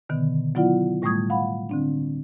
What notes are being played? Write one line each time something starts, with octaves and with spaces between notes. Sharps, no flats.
B2 D3 D#3 B3
F#3 B3 E4 F4 D5 F#5
A2 G3 A3 C#6 D#6 G#6
F5 F#5 B5
D3 C4 D4